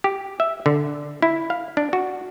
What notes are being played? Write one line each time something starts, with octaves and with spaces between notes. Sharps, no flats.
G4
E5
D3
E4
F5
D4
F#4